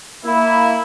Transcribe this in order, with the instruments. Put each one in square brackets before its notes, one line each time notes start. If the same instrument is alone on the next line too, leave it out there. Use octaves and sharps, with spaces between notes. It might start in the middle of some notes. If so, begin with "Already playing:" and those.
[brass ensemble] A#3 E4